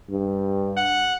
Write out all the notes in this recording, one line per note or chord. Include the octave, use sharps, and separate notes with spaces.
G2
F#5